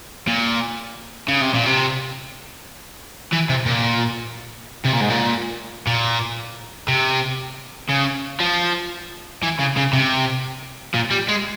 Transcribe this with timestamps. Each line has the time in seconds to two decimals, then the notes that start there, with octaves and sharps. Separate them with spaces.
0.27 A#2
1.29 C#3
1.42 C3
1.54 A#2
1.66 C3
3.33 E3
3.49 C3
3.66 A#2
4.85 C3
4.93 A#2
5.01 G#2
5.10 A#2
5.87 A#2
6.88 C3
7.89 C#3
8.40 F3
9.43 E3
9.59 C#3
9.77 C#3
9.93 C3
10.94 A#2
11.11 G3
11.29 G#3